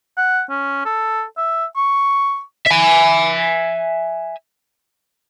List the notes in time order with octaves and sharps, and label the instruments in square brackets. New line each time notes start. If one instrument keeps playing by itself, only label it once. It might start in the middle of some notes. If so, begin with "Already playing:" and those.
[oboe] F#5
C#4
A4
E5
C#6
[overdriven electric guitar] E5 G#5